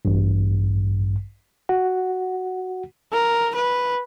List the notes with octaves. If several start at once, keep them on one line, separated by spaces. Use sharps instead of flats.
A1 G2
F#4 F#5
A#4
B4